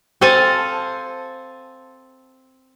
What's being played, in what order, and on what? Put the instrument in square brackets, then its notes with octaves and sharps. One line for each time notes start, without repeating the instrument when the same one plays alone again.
[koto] C4 A4 C5 F5 G#5 A5